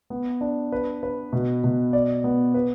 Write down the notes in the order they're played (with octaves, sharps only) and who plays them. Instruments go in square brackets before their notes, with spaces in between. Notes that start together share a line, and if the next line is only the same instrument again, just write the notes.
[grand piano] B3
D4
B4
B4
B2
B2
D5
B3
B4